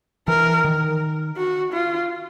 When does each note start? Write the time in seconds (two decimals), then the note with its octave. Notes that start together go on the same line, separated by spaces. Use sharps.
0.28 E3 A#4
0.65 D#3
1.37 F#4
1.73 F4